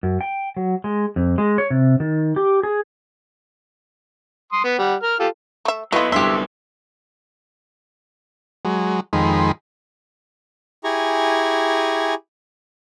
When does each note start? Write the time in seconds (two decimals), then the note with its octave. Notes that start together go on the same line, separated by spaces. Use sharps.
0.03 F#2
0.21 G5
0.57 F#3
0.84 G#3
1.16 F2
1.38 G#3
1.58 C#5
1.70 C3
2.00 D#3
2.36 G4
2.63 G#4
4.53 C6 D#6
4.65 B3
4.79 G3 F#5
5.03 A#4 F6
5.20 F4 G4 A4
5.65 A3 E5
5.92 F#3 A3 B3 E4 F4 B4 D#5
6.12 C2 D3 G4 E5 C6
8.65 F#3 G#3
9.13 F2 D#3 G#3 B5 C6
10.84 E4 G4 G#4 G#5 A#5 C#6